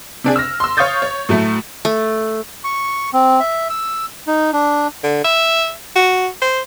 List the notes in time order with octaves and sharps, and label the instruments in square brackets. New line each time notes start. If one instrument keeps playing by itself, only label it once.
[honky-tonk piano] C3 D4 G#4
E6 F6 A#6
C6 E6
C#5 F5 C#6 D#6 G6 A6
C#5
A2 F#3 A3
[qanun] A3
[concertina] C#6
C4
E5
E6
D#4
D4
[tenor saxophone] D3
E5
F#4
C5